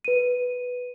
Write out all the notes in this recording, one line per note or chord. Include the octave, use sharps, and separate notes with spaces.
B4 D#7